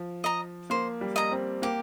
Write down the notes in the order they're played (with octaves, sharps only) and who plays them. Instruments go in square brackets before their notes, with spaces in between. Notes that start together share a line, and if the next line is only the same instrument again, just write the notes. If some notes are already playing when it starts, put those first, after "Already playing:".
Already playing: [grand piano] F3
[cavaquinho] D#5 A#5
[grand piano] A#3 [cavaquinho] C5
[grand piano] G3
[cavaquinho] D#5 A#5
[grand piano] C4
[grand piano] A#3 [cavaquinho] G4